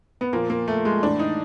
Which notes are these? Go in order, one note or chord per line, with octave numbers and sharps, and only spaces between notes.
B3
A#2 F3 A#3
A#3
A3
G#3
A2 E3 D4
D#4